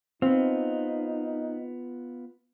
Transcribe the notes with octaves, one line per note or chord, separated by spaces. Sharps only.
B3 C4 D#4 F4